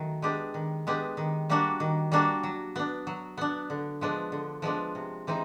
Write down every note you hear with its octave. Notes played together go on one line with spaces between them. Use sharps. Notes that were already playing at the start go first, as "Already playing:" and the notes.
Already playing: D#3 F#3 A3 F#4
G#3 B3 D4 G4
D#3
G#3 B3 D4 G4
D#3
G3 A#3 D4 F#4
D#3
G3 A#3 D4 F#4
F#3
B3 D4
F#3
B3 D4
D3
F3 G#3 B3 D4
D3
F3 G#3 B3 D4
C3
E3 G#3 C4 D#4